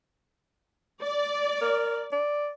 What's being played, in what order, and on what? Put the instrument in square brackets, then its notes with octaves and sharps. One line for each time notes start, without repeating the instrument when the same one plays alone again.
[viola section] D5
[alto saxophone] A#4
D5